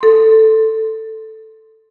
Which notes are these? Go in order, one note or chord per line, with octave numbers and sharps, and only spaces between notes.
A4 C6